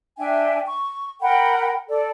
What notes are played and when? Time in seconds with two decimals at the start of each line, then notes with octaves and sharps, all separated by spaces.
0.18 D4 E5 G5 G#5
0.66 C#6
1.21 A#4 F#5 G5 B5
1.89 A4 D5